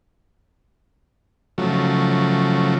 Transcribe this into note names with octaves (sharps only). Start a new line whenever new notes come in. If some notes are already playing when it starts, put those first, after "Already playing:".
C#3 F3 F#3 A3